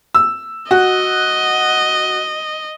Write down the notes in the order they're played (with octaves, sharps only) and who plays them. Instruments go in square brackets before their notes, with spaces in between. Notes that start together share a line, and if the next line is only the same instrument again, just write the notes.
[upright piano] E6
[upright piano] F#4 [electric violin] D#5